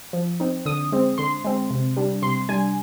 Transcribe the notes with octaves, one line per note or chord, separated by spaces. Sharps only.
F3
C4 D#4
D3 D#6
G#3 C4
D3 C6
G#3 C4
C3
G3 D4
C3 C6
G3 D4 G#5